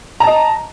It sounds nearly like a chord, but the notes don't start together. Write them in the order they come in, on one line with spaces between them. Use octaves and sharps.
A#5 A5 D#5